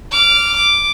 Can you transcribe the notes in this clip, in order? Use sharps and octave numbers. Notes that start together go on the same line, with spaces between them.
D6 F6
D6